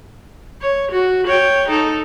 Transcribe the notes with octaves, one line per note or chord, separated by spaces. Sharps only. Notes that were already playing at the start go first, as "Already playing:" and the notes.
C#5
F#4
C#5 G5
D#4 A4